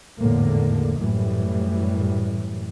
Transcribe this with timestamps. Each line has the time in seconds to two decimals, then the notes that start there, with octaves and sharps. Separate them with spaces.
0.19 G#1 E2 A2 D3 A#3
0.97 F#2 A2 E3 G3